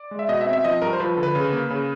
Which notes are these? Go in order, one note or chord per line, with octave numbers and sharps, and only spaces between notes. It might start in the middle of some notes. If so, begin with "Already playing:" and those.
Already playing: D5
G#3
E5
B2 D#5
E5
C4
E5
F3 D#5
G2 A#4
C5
F3 B4
D3
B4
C#3
A#3
C#3